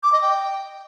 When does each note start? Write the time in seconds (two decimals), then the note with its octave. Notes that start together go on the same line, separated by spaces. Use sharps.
0.03 D6
0.12 D#5
0.22 G5